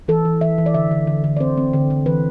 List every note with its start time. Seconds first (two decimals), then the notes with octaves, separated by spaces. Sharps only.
0.08 E3 A4
0.25 E3
0.41 E3 E5
0.58 E3
0.66 D5
0.74 D3 E5
0.91 D3
1.07 D3
1.24 D3
1.36 D5
1.40 C4 C5
1.57 C4
1.73 D3
1.90 D3
2.06 E3 B4